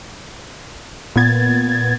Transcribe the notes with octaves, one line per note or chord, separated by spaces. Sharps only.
A#2 B3 G#6 A6